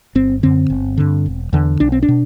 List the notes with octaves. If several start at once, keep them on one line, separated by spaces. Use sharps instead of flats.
G1 C4
F#2 D3 C4
G1
G2 D3
E1
E2 D3
B1 D4
C4
D4
B2